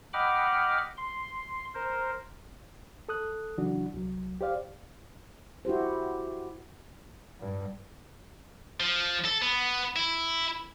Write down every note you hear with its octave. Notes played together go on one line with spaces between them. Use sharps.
D#5 F#5 G5 B5 D6 F6
C6
A#4 C5
A4 D#6 F#6
C#3 E3 F#3 D4 F#4
C2 F#3
G4 C5 D5 F5
E4 F#4 G4 C5
G2
F3
A4
B3
E4